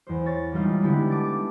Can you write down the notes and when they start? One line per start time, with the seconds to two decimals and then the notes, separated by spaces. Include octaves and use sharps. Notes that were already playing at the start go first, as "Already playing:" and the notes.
0.07 E2 C5
0.26 C#5 A6
0.52 E3 G3 G#3 D#4 F4
0.82 D3 G#3 B3 E4 G4
1.10 A5 D6 A6